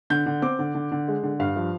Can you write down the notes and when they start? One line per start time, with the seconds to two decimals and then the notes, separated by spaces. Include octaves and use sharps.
0.10 D3 G6
0.26 D3
0.42 C4 D6
0.59 D3
0.75 D3
0.92 D3
1.08 G#3
1.23 D3
1.39 G2 F5
1.56 F3